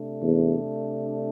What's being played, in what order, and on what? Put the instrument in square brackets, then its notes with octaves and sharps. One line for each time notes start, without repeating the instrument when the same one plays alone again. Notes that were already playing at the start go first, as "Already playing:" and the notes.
Already playing: [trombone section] C3 A3 D4
[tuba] E2